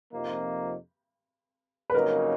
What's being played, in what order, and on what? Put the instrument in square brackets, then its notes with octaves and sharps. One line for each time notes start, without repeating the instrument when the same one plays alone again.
[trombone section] F2 C3 F3 A#3 D#4
[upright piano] B4
[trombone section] F2 C#3 F#3 A#3 D#4 [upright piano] A#4